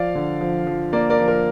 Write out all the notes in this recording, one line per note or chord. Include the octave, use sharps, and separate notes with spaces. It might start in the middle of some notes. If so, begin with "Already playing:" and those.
Already playing: F3 D5 F5
D3
F3
F3
A#3 A#4 D5
A#4 D5
F3
A#4